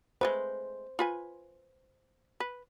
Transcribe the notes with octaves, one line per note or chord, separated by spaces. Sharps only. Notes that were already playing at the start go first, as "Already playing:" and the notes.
G#3 A3 B4 C5
F4 B4 G#5
B4